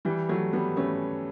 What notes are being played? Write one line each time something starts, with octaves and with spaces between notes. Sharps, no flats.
E3 G3
F#3 A3
G3 B3
A3 C#4